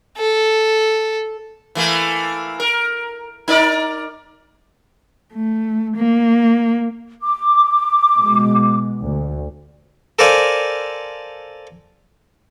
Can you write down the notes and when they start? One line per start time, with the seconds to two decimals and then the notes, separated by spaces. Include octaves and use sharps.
0.17 A4
1.75 E3 A3 A#3
2.60 A#4
3.48 D#4 A#4 D5
5.34 A3
5.96 A#3
7.23 D6
8.18 B2 G#3
9.02 D2
10.19 A4 A#4 C5 D5 F5 G#5